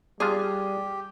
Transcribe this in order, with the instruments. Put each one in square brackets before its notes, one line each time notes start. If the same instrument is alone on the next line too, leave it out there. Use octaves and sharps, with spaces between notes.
[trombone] G3 [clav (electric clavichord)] D4 F4 [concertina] G4 [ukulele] G#4